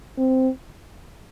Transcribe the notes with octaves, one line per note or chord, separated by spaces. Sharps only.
C4